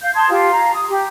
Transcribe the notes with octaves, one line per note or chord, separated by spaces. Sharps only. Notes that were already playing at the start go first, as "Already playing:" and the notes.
F5 G6
A5 C6 D#6 G#6
F4 G4
F5 A#5
D#6
G4